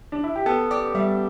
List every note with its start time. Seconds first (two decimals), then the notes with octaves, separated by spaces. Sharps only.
0.12 D4
0.24 E4
0.36 G4
0.46 B3 A4
0.71 G4 D5
0.95 G3 E5